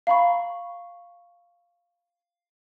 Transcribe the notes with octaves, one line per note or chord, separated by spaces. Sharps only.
F5 A#5 B5 C#6